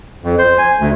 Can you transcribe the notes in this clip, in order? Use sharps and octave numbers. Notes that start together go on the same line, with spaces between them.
F2
C5
G#5
D2